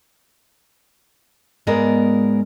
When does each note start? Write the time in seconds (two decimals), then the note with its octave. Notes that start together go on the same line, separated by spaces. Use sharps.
1.67 G#2 G#3 B3 A#4 D5